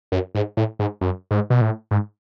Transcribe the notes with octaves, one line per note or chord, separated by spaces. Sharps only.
F#2
G#2
A2
G#2
F#2
G#2
B2
A2
G#2